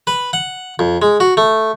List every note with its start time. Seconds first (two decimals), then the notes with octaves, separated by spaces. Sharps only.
0.07 B4
0.33 F#5
0.79 F2
1.02 G#3
1.20 F#4
1.37 A3